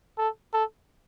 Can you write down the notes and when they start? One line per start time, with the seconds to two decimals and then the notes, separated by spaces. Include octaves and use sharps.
0.18 A4
0.54 A4